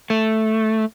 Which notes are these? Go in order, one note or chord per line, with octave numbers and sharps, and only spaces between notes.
A3